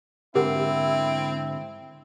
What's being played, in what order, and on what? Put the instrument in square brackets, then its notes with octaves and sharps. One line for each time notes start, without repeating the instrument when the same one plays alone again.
[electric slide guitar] G#2 D3 [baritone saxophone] C4 [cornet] E4 [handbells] G4 A#4 F#5